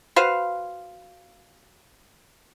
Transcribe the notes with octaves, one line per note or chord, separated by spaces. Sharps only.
F#4 B4 C5 F5